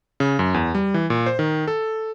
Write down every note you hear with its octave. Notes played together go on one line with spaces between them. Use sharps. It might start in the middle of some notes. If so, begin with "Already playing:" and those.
C#3
F#2
E2
G3
E3
A#2
C5
D#3
A4